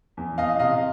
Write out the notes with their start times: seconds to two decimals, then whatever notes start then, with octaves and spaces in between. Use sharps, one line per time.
0.17 E2
0.38 E2 D#5 F5
0.59 C3 D#5 F5